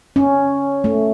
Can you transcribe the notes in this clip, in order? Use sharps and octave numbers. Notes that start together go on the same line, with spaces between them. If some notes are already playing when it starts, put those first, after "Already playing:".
C#4
A3